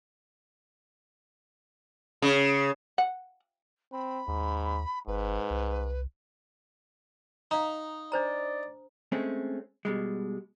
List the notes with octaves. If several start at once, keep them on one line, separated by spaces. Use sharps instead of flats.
C#3
F#5
C4 B5
D#2 G#2
G1 G#2 B4
C2
D#4 F5 A#5
D4 C5 D5 A#5
G#3 A3 C4 C#4
B2 G3 G#3